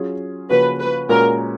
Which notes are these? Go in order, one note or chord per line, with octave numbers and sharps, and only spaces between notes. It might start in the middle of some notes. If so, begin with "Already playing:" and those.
Already playing: F#3 C#4 F4 G#4
C#3 F3 A#3 C#4 F#4 B4
B4
A#2 G#3 C#4 F#4 A#4